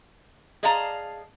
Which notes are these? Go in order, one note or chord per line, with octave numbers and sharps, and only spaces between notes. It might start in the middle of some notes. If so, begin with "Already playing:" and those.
G#4 D5 D#5 F5 A5 A#5